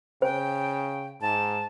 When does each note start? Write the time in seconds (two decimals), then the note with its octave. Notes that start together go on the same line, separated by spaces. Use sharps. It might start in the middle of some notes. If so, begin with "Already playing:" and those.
0.22 C#3 C5 G5
1.21 G#2 A5